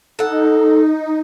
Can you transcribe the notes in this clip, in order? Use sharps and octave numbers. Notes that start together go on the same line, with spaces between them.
D#4 A4 F#5